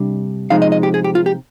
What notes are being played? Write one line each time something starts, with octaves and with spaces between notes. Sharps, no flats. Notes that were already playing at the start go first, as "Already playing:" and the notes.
Already playing: C3 G3 D4
C3 F3 G#3 D#4 F5
D#5
D#5
G4
G#4
G4
F4
G4